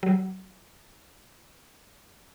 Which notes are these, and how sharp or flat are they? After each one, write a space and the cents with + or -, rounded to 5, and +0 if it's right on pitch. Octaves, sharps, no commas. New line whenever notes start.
F#3 +30